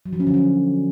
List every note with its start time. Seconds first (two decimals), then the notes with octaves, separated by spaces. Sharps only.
0.06 F#3
0.13 F3
0.20 C#4
0.27 D3
0.34 C#4